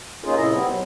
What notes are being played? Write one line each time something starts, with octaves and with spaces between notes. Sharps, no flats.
C#3 A#3 C#4 D#4 F4 G#4
A2 C3 E4 D#5
G3 B3 C4
B2 F#3